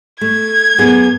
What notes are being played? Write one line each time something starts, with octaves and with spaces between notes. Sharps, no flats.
A3 G#6
F#2 B3 G#4